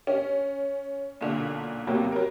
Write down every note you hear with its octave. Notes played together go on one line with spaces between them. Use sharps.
C#4
B1 A#2 D3
D#2 A2 C3 F#3 A#3 B3
F#3 A#4